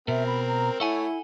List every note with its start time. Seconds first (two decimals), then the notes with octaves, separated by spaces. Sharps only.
0.08 B2 C4 A#4 E5
0.27 B5
0.48 A#5
0.80 A3 E4 A4 C#5 F#5 G#5